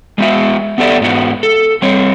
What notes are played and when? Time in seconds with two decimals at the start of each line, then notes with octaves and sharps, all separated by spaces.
0.18 G#3 B3 F4 F#4 E5
0.78 B3 G4 A4 D5 E5
1.00 G#2 B3 F#4
1.43 A4
1.82 G3 C4 C#5